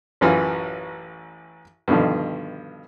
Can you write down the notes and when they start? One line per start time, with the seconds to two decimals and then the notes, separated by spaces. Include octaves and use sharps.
0.21 A1 F#2 E3 F4
1.88 G2 B2 D3 D#3 F3